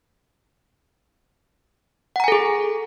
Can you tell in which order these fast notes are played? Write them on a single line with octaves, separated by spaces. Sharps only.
F#5 A#5 G#5 A4 G#4